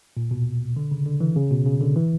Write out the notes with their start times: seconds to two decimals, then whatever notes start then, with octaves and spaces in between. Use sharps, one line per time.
0.17 A#2
0.31 B2
0.76 D3
0.91 C#3
1.06 D3
1.20 E3
1.36 C#3
1.51 B2
1.66 C#3
1.81 D3
1.96 E3